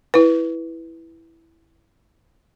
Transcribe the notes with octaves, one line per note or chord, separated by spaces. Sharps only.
E4 B4